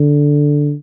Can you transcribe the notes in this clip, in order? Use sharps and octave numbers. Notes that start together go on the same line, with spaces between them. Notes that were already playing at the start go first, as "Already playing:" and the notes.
Already playing: D3